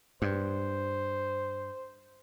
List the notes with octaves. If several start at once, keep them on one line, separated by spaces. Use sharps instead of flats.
G2 C5